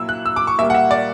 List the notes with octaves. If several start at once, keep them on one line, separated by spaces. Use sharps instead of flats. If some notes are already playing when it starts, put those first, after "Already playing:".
Already playing: A#2 F#3 E4 E6
F#6
E6
D6
C#6
A#2 G3 A#3 E5
F#5
E5
D5